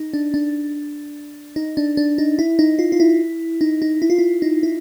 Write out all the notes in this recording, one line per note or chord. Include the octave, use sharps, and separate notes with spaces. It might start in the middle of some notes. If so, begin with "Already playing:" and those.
Already playing: D#4
D4
D4
D#4
D4
D4
D#4
E4
D#4
F4
F4
E4
D#4
D#4
E4
F4
E4
D#4
E4